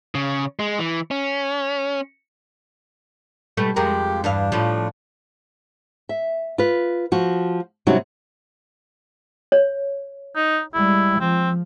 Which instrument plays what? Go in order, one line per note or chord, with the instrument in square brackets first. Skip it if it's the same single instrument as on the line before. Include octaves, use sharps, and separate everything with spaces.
[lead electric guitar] C#3
G#3
E3
C#4
[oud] B2 G3 A3
[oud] F2 G#3 A#4 [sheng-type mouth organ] G4
[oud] E2 G2 F5 [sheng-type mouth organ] D4
[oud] A2 F3
[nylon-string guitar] E5
F4 B4
F3 F#4
C3 F#3 G3 C#4 D#4 F#4
[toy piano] C#5
[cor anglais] D#4
[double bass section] G3 G#3 [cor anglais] E4
[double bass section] F3 [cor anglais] C4